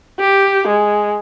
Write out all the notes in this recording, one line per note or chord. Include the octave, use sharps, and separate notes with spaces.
G4
G#3